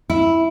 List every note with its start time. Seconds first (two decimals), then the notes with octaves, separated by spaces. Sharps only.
0.10 E4